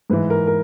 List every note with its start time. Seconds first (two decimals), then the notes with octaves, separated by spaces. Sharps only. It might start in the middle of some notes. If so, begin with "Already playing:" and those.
0.10 G#2 E3 B4
0.30 A#4
0.47 A#4